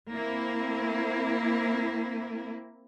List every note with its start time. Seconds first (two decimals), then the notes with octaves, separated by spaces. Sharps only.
0.12 A#3 C4 E4